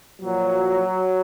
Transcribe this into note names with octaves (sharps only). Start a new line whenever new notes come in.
A#2 F3 F#3